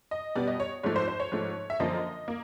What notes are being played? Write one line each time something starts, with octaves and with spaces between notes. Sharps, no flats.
D#5
B2 G3 B3 D5
D#5
C#5
G#2 F3 A3 C#5
C5
C5
C#5
G#2 F3 A3
E5
F#2 D3 F3 A#3 D#5
A#3